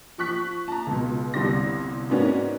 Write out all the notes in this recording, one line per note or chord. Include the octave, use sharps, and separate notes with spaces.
F3 C#6 F#6 B6
A5 A#5
C#2 B2
G1 C2 G3 D4 C6 A#6
G#2 A#3 B3 C#4 D4 F#4